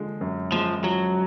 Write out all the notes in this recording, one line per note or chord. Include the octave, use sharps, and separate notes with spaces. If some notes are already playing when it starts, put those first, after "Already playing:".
Already playing: D3 F3 G#3
F#2
F3 G#3
F3 F#3